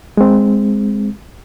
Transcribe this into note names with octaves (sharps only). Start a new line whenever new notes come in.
G#3 C4